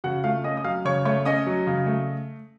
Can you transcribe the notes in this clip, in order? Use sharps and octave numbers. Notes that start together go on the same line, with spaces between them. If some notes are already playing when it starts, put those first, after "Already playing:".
C#3 F#4 F#5
A3 F4 F5
C#4 D#5 D#6
D#6
F#3 F5 F6
C#3 C#5 C#6
A3 C#5 C#6
C#4 D#5 D#6
F#3
C#3
A3